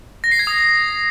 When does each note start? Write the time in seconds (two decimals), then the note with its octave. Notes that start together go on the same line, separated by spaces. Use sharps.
0.24 A#6
0.32 C7
0.39 G#6
0.47 D#6